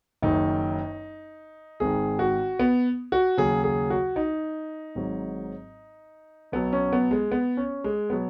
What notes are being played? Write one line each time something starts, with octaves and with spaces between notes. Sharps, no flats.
F#1 F#2 D#3 D#4
G#1 G#2 D#3 G#4
F#4
B3
F#4
D#2 C#3 F#3 G#4
G#4
F#4
D#4
G#1 G#2 F#3
B1 B2 F#3 B3
C#4
B3
G#3
B3
C#4
G#3
B2 F#3 B3